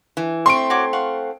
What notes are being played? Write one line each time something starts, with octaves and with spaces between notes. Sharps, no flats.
E3
A3 C4 C6 C#6 D7
F#4 C#5 D6
F5 F#5 C#6